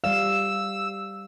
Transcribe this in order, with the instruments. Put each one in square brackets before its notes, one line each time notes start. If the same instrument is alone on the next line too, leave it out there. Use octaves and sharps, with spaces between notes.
[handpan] G3 D5 F5 [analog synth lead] E6